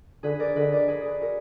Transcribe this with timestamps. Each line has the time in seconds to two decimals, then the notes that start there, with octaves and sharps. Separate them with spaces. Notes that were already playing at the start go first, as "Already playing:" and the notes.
0.23 D3 G#4 B4
0.40 A#4 D5
0.56 D3 B4 D#5
0.72 A#4 D5
0.88 G#4 B4
1.05 G#4 B4
1.21 F#4 A#4